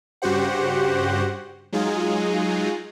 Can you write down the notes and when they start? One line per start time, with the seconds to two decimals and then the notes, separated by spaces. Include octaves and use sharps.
0.22 G2 C#3 F#4 G4 C5 F#5
1.73 F#3 G#3 D#4 F4 G#4